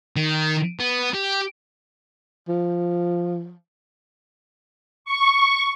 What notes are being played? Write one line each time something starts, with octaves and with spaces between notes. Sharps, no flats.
D#3
B3
G4
F3
C#6